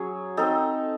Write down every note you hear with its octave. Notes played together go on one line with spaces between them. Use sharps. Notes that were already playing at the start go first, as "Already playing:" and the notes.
Already playing: F#3 C#4 G#4 C#5
C4 D#4 A4